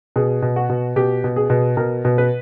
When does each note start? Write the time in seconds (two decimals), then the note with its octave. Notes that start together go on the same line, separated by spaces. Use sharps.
0.16 B2 G#4
0.42 B2
0.56 F#4
0.69 B2
0.96 B2 G4
1.24 B2
1.36 G#4
1.50 B2
1.77 B2 A#4
2.05 B2
2.18 B4